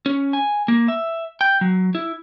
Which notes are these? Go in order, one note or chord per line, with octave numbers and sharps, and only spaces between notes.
C#4
G#5
A#3
E5
G5
F#3
E4